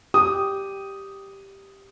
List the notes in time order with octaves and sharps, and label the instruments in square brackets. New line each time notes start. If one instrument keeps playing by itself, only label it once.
[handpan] G4 [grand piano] D#6